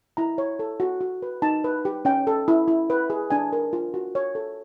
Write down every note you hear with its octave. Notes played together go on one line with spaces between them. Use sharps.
E4 A#5
C#5
A4
F#4
F#4
B4
D#4 A5
B4
G4
C#4 G5
A4
E4
E4
B4
G#4
D4 G#5
A#4
F4
F#4
C#5
A4